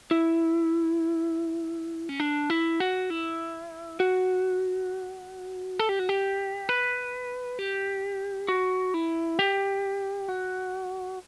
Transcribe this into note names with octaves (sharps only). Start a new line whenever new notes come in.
E4
C#4
D4
E4
F#4
E4
F#4
A4
G4
F#4
G4
B4
G4
F#4
E4
G4
F#4